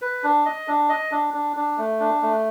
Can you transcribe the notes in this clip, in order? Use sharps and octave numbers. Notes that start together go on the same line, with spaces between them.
B4
D4
D#5
D4
D#5
D4
D4
D4
A3
D4
A3